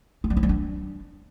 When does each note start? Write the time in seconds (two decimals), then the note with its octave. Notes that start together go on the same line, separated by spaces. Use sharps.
0.24 F4
0.30 G3
0.37 E4
0.43 G3
0.49 D4